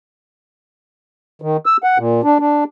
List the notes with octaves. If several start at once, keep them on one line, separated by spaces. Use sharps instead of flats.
D#3
E6
F#5
A#2
D4
D4